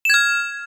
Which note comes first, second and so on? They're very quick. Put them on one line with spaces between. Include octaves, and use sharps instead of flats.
E7 G#6 F6